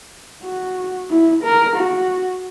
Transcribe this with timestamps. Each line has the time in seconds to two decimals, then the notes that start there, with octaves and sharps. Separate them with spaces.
0.44 F#4
1.10 E4
1.43 A#4
1.76 F#4